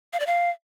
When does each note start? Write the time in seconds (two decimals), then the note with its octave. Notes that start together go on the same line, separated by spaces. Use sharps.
0.13 F5
0.20 D5
0.27 F5